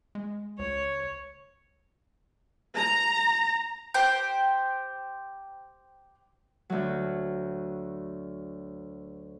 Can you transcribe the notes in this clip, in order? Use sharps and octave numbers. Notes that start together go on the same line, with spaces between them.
G#3
C#2 C#5
A#5
G4 C5 G5
D2 F#3